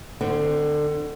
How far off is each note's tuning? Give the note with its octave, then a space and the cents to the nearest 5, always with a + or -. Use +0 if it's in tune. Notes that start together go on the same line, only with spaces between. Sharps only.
D3 +25 C4 -20